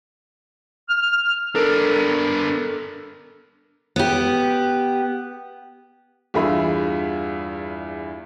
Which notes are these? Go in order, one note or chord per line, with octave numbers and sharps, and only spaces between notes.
F6
B3 D4 A4 A#4
B3 G4
E2 G2 F4 G#4 E5 B5